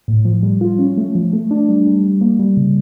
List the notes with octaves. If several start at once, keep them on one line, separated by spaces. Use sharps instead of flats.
A2
F3
G3
F4
C#4
A3
F3
A3
D4
G3
G3
G3
A#3
G3
C#3